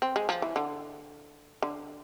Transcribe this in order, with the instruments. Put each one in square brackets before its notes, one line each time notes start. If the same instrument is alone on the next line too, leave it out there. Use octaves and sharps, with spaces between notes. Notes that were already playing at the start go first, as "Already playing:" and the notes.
[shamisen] C4
G#3
F3
E3
D3
D3